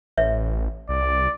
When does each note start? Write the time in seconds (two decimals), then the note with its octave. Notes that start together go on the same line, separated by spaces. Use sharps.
0.17 A1 B4 C#5 E5
0.89 C2 D5